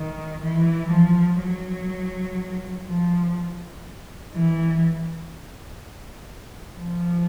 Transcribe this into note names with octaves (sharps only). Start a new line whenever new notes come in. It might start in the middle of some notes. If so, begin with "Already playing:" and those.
Already playing: D#3
E3
F3
F#3
F3
E3
F3